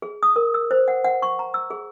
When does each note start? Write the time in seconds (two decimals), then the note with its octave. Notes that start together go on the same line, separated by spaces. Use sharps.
0.02 G#4
0.23 D#6
0.36 A#4
0.54 E6
0.71 C5
0.88 F#5
1.04 F#5
1.22 C#6
1.39 A#5
1.54 E6
1.70 G#4